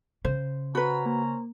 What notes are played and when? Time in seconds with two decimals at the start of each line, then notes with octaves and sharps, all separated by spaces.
0.25 C#3 C5
0.75 C#4 F#4 B4 C5 A#5 B5
1.06 A#3